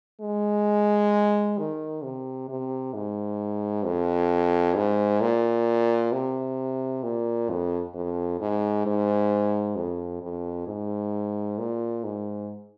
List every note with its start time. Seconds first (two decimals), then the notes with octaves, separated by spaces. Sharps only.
0.21 G#3
1.58 D#3
2.04 C3
2.49 C3
2.94 G#2
3.85 F2
4.76 G#2
5.21 A#2
6.12 C3
7.03 A#2
7.50 F2
7.95 F2
8.40 G#2
8.86 G#2
9.76 F2
10.22 F2
10.68 G#2
11.59 A#2
12.04 G#2